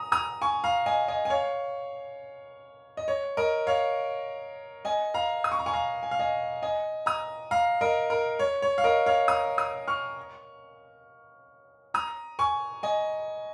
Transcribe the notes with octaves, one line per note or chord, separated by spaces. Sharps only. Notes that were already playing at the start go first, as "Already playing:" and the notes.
Already playing: A#5 D#6
A#5 D#6
G#5 C#6
F5 A#5
D#5 G#5
D#5 G#5
G#5
C#5 F5
D#5
C#5
A#4 D#5
C#5 F5
D#5 G#5
F5 A#5
D#6
C#6
A#5
G#5 C#6
F5 A#5
G#5
F5
D#5 G#5
D#5 G#5
A#5 D#6
F5 A#5
A#4 D#5
A#4
C#5
C#5
F5
A#4 D#5
C#5 F5
A#5 D#6
A#5 D#6
C#6 F6
A#5 D#6
G#5 C#6
D#5 G#5